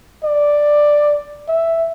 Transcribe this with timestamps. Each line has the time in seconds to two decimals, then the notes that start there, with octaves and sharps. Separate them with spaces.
0.24 D5
1.49 E5